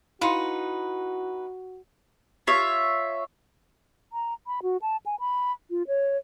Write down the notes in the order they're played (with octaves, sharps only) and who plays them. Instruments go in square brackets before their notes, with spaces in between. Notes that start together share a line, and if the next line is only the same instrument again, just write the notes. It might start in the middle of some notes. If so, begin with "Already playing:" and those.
[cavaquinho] D#4 B4 [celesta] E4 B5 C#7 [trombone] F#4 [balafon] F5 C6
[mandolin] F4 C#5 E5
[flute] A#5
B5
F#4
A5
G#5
B5
F4
C#5